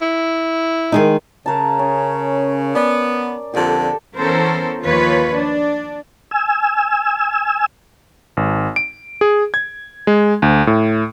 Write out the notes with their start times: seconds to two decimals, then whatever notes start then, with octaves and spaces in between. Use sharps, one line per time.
0.01 E4
0.92 D#3 G#3 D#4
1.46 C#3 A#4 A5
1.79 C#4
2.75 B3 D5
3.54 F2 A#2 D3 G4 A4
4.18 E3 B3 C#4 A4 A#4 C5
4.84 D#2 F3 F4 B4 C#5
5.35 D4
6.31 G#5 E6
8.37 G#1
8.76 D7
9.21 G#4
9.54 G#6
10.07 G#3
10.42 D2
10.67 A2